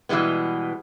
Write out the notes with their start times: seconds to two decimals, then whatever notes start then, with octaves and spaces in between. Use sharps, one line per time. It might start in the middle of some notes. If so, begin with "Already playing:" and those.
0.09 B2 E3 G3 G#3 B3